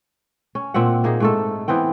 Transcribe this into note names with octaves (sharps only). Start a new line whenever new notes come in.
C#4
A#2 C4 E5 F#5
A#3 D#4 G#4
G#2 A3 A4
E3 B3 C4 G5